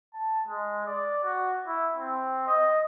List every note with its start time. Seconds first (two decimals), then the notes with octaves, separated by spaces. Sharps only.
0.14 A5
0.47 G#3
0.87 D5
1.24 F#4
1.67 E4
1.97 C4
2.47 D#5